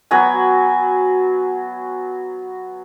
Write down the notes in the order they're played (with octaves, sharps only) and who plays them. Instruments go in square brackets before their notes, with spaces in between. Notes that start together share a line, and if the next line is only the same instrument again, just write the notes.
[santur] F#3 B3 F#4 G#5